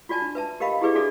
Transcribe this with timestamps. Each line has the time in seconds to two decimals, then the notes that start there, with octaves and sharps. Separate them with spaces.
0.09 F4 F#4 D5 G#5 A5
0.22 D4
0.35 B4 E5 A5
0.60 G4 A#4 D#5 F5 B5
0.81 E4 G4 G#4 B4 D5 E5
0.95 D4 F#4 G#4 A4 D5 E5